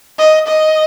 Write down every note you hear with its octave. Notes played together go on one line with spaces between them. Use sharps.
D#5
D#5